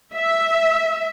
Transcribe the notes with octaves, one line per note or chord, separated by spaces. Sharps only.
E5